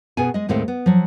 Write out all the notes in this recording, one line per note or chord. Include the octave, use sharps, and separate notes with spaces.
B2 B3 G#4 G#5
G#3 D#5
D#2 A2 G#3 C4 A4 F5
B3
F3 F#3